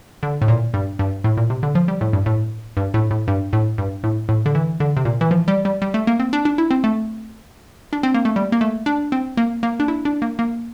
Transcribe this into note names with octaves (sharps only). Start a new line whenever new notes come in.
D3
A2
A#2
G2
G2
A2
A#2
C3
D3
F3
G3
A2
G2
A2
G2
A2
A2
G2
A2
G2
A2
A2
D3
E3
D3
C3
A#2
E3
F3
G3
G3
G3
A3
A#3
C4
D4
D4
E4
C4
A3
D4
C4
A#3
A3
G3
A#3
A3
D4
C4
A#3
A#3
D4
E4
D4
A#3
A#3